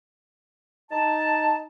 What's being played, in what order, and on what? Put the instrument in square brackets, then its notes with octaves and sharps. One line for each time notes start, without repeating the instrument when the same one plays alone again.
[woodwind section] D#4 A5